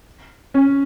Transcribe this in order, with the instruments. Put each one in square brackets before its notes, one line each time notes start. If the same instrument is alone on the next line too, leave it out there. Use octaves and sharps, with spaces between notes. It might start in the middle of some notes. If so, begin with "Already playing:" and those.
[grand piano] C#4